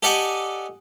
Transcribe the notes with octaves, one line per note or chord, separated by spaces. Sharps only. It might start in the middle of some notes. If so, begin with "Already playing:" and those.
G4 A4 D5 D#5 F#5 G#5